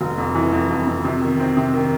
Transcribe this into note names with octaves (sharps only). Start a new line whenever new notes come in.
F1
F2
E3
F2
F2
F2
C3
D#3
C4
C3
D#3